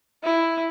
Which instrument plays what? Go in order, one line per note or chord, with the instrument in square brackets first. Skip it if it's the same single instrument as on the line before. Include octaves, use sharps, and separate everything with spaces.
[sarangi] E4